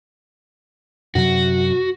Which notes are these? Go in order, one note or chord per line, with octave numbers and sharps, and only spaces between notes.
F#2 C3 F#3 F#4